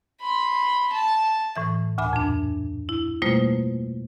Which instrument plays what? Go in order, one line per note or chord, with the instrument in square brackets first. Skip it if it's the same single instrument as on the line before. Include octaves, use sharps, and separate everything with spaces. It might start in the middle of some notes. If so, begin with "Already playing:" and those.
[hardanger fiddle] B5 C6
A5
[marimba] A2 E3 E5
D2 A#2 E5 G#5 B5
F2 D4
E4
B2 G3 A3 A#3 F4 C5